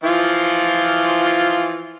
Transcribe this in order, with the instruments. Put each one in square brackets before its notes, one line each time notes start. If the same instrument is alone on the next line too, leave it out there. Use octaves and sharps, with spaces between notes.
[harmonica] E3 F3 F4